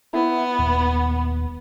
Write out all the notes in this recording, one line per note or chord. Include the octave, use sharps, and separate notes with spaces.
B3 E4
D#1